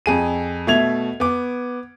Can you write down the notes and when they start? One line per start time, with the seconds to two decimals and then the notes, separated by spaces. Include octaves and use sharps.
0.06 F2 G#4 D#7
0.67 B2 A3 E5 G#6 F7
1.20 B3 D6